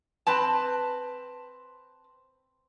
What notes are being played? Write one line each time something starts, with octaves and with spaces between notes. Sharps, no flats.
C4 B4 A5